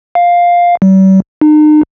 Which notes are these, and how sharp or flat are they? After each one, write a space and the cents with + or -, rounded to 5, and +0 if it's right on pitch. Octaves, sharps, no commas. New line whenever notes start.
F5 +5
G3 -45
D#4 -40